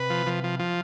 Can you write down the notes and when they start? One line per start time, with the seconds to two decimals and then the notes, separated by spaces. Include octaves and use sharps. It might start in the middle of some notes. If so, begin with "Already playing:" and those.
Already playing: C3 B4
0.10 F3
0.27 F3
0.44 F3
0.59 F3